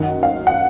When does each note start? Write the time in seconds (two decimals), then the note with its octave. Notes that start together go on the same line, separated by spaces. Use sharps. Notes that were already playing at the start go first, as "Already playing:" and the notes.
Already playing: F#2 D#3 F#5
0.23 F5
0.47 F#5